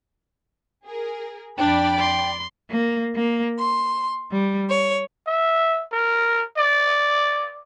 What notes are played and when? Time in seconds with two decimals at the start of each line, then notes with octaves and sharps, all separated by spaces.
0.85 G#4 A#4
1.58 F2 D4 D5 G5 B5
1.99 C6
2.69 A#3
3.15 A#3
3.58 C6
4.31 G3
4.69 C#5
5.27 E5
5.92 A#4
6.58 D5